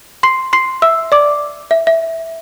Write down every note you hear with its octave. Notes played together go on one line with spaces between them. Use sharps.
C6 C7
C6 C7
E5 E6
D5 D6
E5
E5